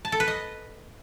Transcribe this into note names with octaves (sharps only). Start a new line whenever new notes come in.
A5
A4
B4
D#5